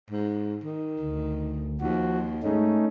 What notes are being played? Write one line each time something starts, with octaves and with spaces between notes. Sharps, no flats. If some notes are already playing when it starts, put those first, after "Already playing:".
G#2
D#3
D2
D#2 F3 F#4
G#2 A3 C#4 D#4